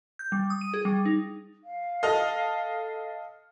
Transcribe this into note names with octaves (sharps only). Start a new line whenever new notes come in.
G6
G3
D#6
D#7
G#4
G3
D#4
F5
A4 D#5 F6